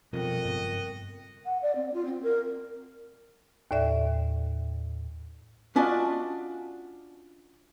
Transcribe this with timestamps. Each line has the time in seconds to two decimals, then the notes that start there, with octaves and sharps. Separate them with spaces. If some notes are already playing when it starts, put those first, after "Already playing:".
0.13 F2 B2 F3 G3 F#4 A#4 D#5 G5
0.44 F#1 G2 B3
1.46 F#5
1.62 D5
1.76 C4
1.94 F4
2.05 C4
2.23 A#4
3.71 D#2 A2 D5 E5
5.76 C#4 D4 F4 F#4 D5 D#5